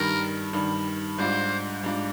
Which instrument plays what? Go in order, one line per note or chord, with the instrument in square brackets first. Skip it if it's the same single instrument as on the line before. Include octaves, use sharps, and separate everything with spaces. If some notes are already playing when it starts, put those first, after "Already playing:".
Already playing: [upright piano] G2 D#3 G3 [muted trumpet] A#4
[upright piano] G2 D#3 G3
[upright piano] G#2 G3 D4 F4 [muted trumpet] C5
[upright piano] G#2 G3 D4 F4